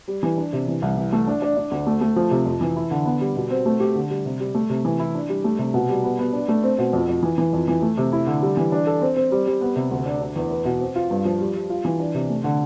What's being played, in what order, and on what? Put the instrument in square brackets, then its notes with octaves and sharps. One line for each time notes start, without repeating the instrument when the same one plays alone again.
[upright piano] G3
E3
D4
C3
E3
C2
E3
A3
D4
D4
D4
D2
A3
A3
F3
C3
F2
E3
E4
D3
B3
G3
B2
C4
A3
G4
D3
G3
C3
G3
A3
C3
E3
E4
D4
G3
A3
C3
B2
G3
B3
B3
D4
A3
C4
B2
F2
F2
E3
E3
F2
E3
A3
C3
E4
D3
G3
E3
D4
A4
C4
C4
G3
G3
B3
C3
D2
D4
D4
E2
B4
B2
C4
F4
G2
F3
G3
G3
F4
E3
D4
C3
A3
D3